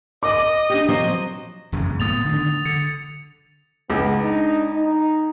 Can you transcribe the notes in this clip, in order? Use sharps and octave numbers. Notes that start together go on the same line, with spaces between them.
D#5 D6
D4 G4
F3 F#3 C4 D#5
E1 F#2 C#3
A2 A3 B3 D#6 A6 F7
D3 D#3
D3 C#7
C#2 C#3 B3
D4 D#4
D#4